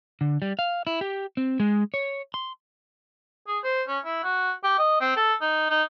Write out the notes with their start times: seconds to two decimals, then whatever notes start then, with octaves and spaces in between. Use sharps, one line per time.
0.21 D3
0.42 G3
0.59 F5
0.87 E4
1.01 G4
1.37 C4
1.60 G#3
1.94 C#5
2.34 C6
3.48 G#4
3.64 C5
3.88 C#4
4.05 E4
4.24 F#4
4.64 G4
4.78 D#5
5.01 C4
5.17 A4
5.41 D#4
5.70 D#4